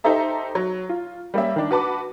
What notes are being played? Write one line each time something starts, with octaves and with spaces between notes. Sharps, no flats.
D#4 G4 A4 C5 E5 A#5
F#3
F4
G3 A#3 C#4 E5
D#3 D4
F#4 B4 A5 D6